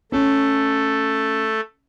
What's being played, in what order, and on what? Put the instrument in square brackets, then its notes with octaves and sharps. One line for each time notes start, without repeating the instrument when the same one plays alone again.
[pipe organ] A3 A4 [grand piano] C#4